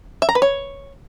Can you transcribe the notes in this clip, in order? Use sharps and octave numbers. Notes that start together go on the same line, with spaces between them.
E5
A#5
B4
C#5